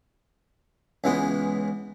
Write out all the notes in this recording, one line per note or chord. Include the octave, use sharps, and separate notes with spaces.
C#2 E3 G#3 B3